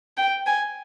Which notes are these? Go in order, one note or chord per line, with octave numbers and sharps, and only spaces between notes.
G5
G#5